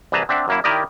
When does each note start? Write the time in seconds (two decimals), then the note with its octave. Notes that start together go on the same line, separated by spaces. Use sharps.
0.12 C2 E3 G#4 B4 A5 A#5
0.29 C4 D4 E5 F#5
0.48 F#2 A#3 E4
0.64 D#3 E4 G4 A#4 D5 D#5